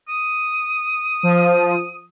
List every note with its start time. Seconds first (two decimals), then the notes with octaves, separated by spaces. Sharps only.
0.08 D#6
1.23 F3